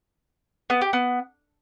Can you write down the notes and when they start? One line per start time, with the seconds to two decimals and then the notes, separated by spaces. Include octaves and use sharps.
0.70 B3
0.81 G4
0.93 B3